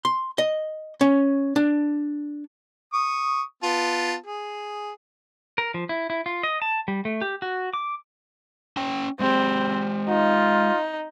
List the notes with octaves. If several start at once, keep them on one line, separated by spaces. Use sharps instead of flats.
C6
D#5
C#4
D4
C#6 D#6
B3 F4 A5
G#4
A#4
F3
E4
E4
F4
D#5
A5
G3
A3
G4
F#4
D6
C#4 G5
G#3 C4 G4
D#4 F4